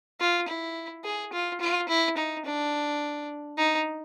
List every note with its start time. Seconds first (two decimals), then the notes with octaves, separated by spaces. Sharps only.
0.20 F4
0.48 E4
1.04 G#4
1.33 F4
1.61 F4
1.89 E4
2.17 D#4
2.45 D4
3.57 D#4